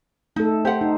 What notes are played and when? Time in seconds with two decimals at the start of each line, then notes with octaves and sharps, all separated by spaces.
0.36 A3 D#4 A4
0.65 G4 C5 F#5
0.81 D#4